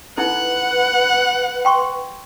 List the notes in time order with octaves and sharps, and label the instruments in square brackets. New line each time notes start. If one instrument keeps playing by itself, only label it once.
[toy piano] D#4 E4 A4 [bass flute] B4 [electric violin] F#5
[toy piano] G5 C6 C#6